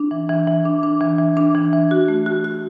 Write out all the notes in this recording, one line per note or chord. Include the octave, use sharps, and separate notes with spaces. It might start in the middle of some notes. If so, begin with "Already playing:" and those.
Already playing: D4
E3
E3
E3
D4
D4
E3
E3
D4
E3
E3
F#4
A3
F#4
F#4